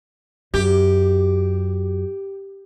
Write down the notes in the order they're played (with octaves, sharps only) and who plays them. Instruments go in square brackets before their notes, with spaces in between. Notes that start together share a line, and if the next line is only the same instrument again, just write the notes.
[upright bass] F#2 [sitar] G4